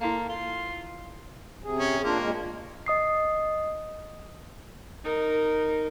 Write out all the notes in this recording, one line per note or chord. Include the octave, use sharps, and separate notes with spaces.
A#3 E4 A4 F5
F4 C6
C3 G#4
C#4
A#3 D4 F4
A#2 G#3
D#5 D#6 C7
D#4 A#4